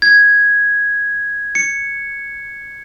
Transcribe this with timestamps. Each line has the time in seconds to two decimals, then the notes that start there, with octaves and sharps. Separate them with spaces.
0.02 G#6
1.55 C#7